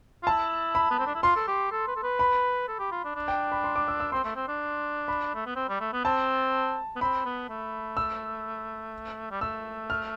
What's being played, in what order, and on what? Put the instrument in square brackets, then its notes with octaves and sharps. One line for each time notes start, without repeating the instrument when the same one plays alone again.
[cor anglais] F4
[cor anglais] E4 [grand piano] A5
[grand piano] B5
[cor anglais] B3
C4
D4
E4
[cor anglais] F4 [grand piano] C6
[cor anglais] A4
G4
A4
B4
A4
B4
[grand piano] B5
[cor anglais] A4
G4
F4
D4
D4
[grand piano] G5
B5
C6
D6
E6
E6
[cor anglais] C4 [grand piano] C6
[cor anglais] A3
C4
D4
[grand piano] B5
[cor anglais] A3
B3
C4
G3
A3
B3
[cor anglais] C4 [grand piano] A5
[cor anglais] B3
[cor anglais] C4 [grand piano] B5
[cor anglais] B3
A3
[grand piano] E6
[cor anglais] G3
[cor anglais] A3 [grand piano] E6
[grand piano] F6